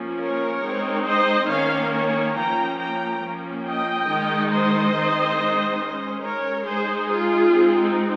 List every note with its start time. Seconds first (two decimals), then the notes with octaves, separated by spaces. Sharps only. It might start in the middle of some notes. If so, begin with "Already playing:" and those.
Already playing: F3 A#3 C#4
0.20 A#4 C#5
0.63 G#3 C4 D#4
1.07 C5 D#5
1.49 D#3 A#3 C#4 C#5 F5
1.92 A#4 C#5
2.35 F3 A#3 C#4 G5 A#5
2.78 G5 A#5
3.21 F3 A#3 C#4
3.64 D#5 G5
4.07 D#3 G#3 D#4
4.50 C5 D#5
4.93 D#3 G#3 C4 D#4
5.80 G#3 C#4
6.22 A#4 C#5
6.65 G#3 D#4 G#4 C5
7.09 F4 G#4
7.51 G#3 C4 D#4